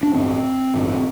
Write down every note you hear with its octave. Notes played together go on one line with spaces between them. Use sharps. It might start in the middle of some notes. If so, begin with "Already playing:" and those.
D4
A1 G2 D3 C4
A1 G2 D3